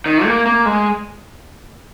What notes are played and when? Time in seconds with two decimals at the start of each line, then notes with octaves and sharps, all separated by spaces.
0.06 D#3
0.25 A#3
0.46 A#3
0.66 G#3